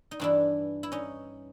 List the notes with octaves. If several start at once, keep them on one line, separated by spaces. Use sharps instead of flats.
D#4
G2 E3 D4 E4
E4
C#4 D#4